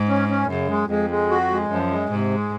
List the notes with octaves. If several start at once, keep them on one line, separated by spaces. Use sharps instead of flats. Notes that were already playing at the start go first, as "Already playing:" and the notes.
Already playing: G#2
C#4
C#4
F#2 C#3
G#3
F2 G#3
G#3
F#4
G#3
F#2 F3
G#3
G#2 C3
G#3